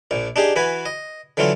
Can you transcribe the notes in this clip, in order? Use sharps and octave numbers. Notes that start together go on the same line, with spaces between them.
A#1 A#2
D4 D#4 G4 G#4
E3 F#4 B4 G#5
D#5
D3 E3 F#3 A3 F4